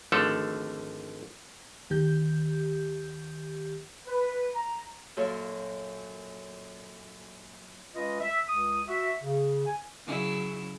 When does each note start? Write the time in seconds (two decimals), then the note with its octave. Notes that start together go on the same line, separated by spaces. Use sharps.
0.12 G#1 D3 F3 A3 A4
1.90 D2 D#3 G4 G6
4.06 B4
4.54 A#5
5.17 F#2 A#2 A4 C#5 F6
7.95 G#3 C#4 F4 B4 D#5
8.21 E5
8.49 C#2 D#6
8.89 F#4 E5
9.21 C#3
9.66 G#5
10.07 C#3 F#3 E4